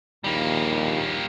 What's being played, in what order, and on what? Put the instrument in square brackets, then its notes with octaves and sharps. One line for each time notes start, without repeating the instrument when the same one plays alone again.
[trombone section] A#1 D#2 [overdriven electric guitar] G3 A#3